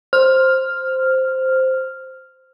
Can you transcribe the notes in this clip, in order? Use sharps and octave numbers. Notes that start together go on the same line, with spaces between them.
C5 F6